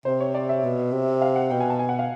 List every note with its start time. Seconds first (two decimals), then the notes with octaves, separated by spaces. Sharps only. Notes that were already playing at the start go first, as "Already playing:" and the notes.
0.05 C3 C5
0.20 C#5
0.35 D5
0.49 E5
0.64 B2
0.92 C3
1.22 F5
1.36 F#5
1.50 B2 G5
1.60 G#5
1.70 A5
1.79 G#5
1.89 F#5
1.99 F5